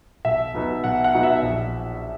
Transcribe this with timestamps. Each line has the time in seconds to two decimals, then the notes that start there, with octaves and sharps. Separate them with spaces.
0.25 B1 E5
0.54 B2 F#3 B3 D#4
0.84 B1 F#5
1.04 F#5
1.14 B2 F#3 B3 D#4
1.23 E5
1.43 A#1 E5